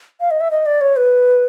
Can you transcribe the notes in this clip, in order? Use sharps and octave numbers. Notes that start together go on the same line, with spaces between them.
F5
D#5
E5
D#5
D5
C#5
B4